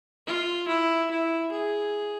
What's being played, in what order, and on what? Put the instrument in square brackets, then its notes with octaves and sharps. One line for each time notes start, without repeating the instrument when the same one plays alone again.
[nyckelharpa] F4
E4
E4
G#4